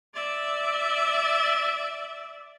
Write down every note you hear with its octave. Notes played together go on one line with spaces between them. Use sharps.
D5 E5